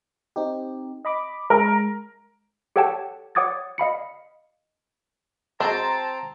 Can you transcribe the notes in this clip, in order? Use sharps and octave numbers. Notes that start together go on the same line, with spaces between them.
C4 D#4 G4
D#5 B5 D6
G#3 A#4 A#5
G4 A4 C#5 F#5 G5 A5
C#5 F#5 D6 D#6 G#6 A6
D#5 F5 B5 C#7
F#3 G#3 C4 D4 A5 A#5 C6